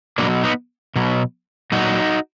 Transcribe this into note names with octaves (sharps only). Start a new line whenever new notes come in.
B2 F#3 A#3 D4
B3 D#4
B2 F#3
A#2 F#3 D#4 F#4